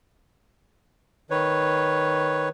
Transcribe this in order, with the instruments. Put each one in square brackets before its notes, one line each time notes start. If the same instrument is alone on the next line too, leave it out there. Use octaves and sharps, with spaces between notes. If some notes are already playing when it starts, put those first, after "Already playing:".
[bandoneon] D#3 B4 C#5